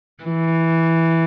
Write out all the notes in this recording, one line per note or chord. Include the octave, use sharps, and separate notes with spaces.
E3